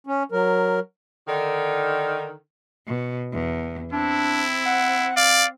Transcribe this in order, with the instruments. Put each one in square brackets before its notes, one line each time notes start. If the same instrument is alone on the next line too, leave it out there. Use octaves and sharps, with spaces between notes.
[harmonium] C#4
F#3 A#4
[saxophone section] D3 D#3
[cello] B2
E2
[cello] C4 [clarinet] D4 [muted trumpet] E4
[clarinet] F#5
[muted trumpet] D5 [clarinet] F5